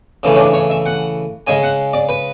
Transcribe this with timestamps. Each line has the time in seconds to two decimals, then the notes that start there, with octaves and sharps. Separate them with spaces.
0.23 C#3 E3 A3
0.35 C#4
0.39 D4
0.54 C#5
0.70 E5
0.86 F#5
1.47 C#3 G#3 G#5
1.63 F#5
1.93 D5
2.09 B4